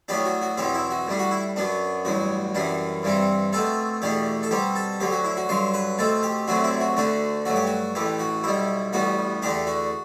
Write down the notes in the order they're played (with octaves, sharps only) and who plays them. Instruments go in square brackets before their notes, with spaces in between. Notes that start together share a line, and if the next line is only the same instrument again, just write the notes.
[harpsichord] A2 F#3 B3 D4 G4
F#4
F#4
E2 B2 F#3 C4 G4
E4
F#4
A2 G3 D4
F#4
E4
F#2 F#3 B3 D4
A1 G2 F#3 F#4
F#2 E3 G3 D4
G2 E3 G3 C4
B2 A3 C4 A4
E2 B2 A3 D4 G4
A4
B2 G3 C4 G4
A4
D2 D3 F#3 G4
F#4
E4
F#4
G2 D3 F#3 C5
B4
B2 A3 C4 A4
G4
D2 C3 F#3 A3 D4 F#4
E4
F#4
D2 D3 A3 D4 F#4
G2 F#3 A3 F#4
G4
F#4
A1 A2 E3 A3 G4
F#4
B1 B2 G3 E4
A1 A2 G3 B3 F#4
E2 D3 A3 D4 G4
F#4